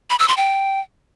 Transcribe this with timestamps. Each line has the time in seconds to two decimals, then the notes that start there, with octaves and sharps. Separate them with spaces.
0.10 B5
0.19 E6
0.28 C6
0.37 G5